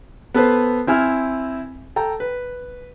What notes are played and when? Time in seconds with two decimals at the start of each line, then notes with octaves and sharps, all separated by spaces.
0.34 B3 A4 B4 C5
0.87 C4 E4 G#5 F6
1.96 A4 G5 A#5
2.20 B4